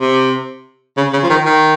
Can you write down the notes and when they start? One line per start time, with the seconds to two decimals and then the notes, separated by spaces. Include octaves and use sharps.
0.01 C3
0.97 C#3
1.13 C#3
1.23 F3
1.29 D#3
1.46 D#3